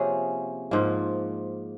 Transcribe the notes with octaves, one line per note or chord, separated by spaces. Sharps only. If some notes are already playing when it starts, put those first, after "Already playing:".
Already playing: C3 F3 A#3 C#4 G#4
G#2 F3 A#3